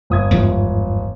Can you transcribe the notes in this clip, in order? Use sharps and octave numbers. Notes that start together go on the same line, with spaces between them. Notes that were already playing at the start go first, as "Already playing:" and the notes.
G1 D#6 G#6
E2 G#2 F3